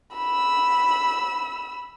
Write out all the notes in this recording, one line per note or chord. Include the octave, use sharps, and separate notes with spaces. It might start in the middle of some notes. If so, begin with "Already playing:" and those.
B5 E6